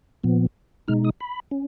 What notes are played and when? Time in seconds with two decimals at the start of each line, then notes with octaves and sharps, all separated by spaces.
0.24 A#2 F3 B3
0.88 B2 G#3 D#4 F6
1.04 D#6
1.21 B5
1.51 C#4